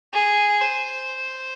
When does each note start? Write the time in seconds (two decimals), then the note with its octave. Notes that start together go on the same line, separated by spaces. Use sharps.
0.14 G#4
0.61 C5